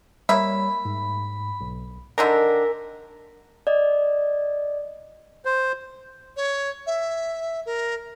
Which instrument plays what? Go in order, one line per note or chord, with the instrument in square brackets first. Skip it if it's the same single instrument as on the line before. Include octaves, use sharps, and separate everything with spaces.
[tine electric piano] G3 C#5 [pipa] A#3 E5 [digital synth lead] B5
[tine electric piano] G#2
B1
[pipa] D3 D#3 D4 [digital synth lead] A#4 [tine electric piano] G#5 E6 B6
[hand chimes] D5 D#5
[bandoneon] C5
[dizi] C#5
E5
A#4